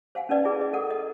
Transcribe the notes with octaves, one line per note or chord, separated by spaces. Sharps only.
C5 F5 F#5 G#5
C#4 D#4 B4 D5 D#5
E4 G#4 B4
G#4 D#5
A4 A#4 F#5
D#5